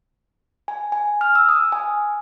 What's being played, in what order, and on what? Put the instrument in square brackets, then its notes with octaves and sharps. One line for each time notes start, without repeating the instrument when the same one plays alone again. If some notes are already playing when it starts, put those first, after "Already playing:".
[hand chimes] G#5
G#5
F6
E6
D#6
G#5